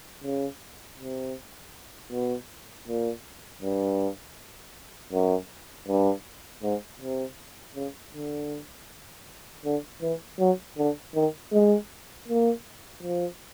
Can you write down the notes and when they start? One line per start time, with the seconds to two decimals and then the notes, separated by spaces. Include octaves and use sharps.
0.23 C#3
0.99 C3
2.12 B2
2.87 A#2
3.62 G2
5.12 F#2
5.88 G2
6.63 G#2
7.01 C3
7.75 C#3
8.14 D3
9.65 D3
10.02 E3
10.39 F#3
10.77 D3
11.15 D#3
11.52 G#3
12.28 A#3
13.02 F3